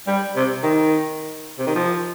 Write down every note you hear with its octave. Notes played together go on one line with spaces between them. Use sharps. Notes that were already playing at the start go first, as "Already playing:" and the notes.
G3
C3
D#3
C3
D#3
F3